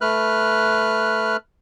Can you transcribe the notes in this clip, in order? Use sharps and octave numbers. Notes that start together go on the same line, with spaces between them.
A3 B4 F6 F#6